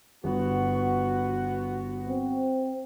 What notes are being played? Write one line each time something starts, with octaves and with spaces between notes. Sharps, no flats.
G1 B3 F#4
C4